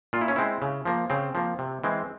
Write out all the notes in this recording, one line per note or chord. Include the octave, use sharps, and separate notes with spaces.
A#2 F4
E4
C#4
G#3 C4 E4
C#3
F3 A#3
C#3 C4
F3 A#3
C3
E3 G#3 C4